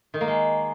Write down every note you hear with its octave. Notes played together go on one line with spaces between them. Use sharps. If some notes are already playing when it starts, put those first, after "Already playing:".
D#3
A#3
G#3